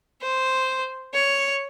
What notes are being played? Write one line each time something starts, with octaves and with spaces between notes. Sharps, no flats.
C5
C#5